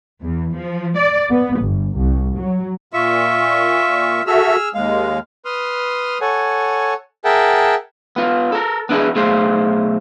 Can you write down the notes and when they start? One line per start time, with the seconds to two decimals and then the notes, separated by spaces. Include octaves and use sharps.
0.22 E2
0.54 F3
0.97 D5
1.31 B3
1.60 G1
1.97 C2
2.37 F#3
2.93 A#2 F4 E5 C#6
4.27 F#4 G#4 A4 E5 E6 F6
4.74 D#2 G#3 F5
5.45 B4 C6 D#6 F6
6.21 A4 C#5 F#5 G#5
7.25 G#4 A#4 E5 F#5 G5 A5
8.16 B3 F4
8.52 A4 A#4
8.89 B3 D4 E4 G#4
9.15 B1 A3 G#4 A4 C5 F5